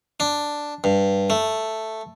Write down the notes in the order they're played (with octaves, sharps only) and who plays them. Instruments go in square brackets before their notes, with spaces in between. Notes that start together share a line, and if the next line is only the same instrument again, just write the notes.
[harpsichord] D4
G2
A3